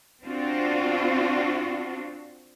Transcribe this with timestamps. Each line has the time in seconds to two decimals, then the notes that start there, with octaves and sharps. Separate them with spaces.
0.25 C4 D4 F4 F#4